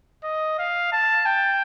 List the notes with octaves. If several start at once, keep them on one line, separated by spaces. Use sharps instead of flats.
D#5
F5
A5
G5